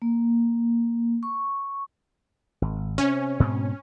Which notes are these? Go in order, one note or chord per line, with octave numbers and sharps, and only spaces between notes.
A#3
C#6
G#1
C3 C#4
G#2 B2 C4